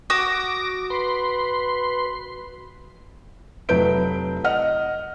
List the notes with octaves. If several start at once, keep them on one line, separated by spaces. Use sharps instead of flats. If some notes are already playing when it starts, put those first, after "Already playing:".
F#4 D6 D#6 A#6
B4 C6
F1 F#3 E4 B4 G6 D7
D#5 F#5 F6